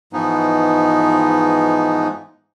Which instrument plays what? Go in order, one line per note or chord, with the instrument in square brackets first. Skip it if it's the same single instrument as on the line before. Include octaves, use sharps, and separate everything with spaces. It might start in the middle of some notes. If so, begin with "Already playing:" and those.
[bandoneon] G#2 E3 F3 G#3 B3 D#4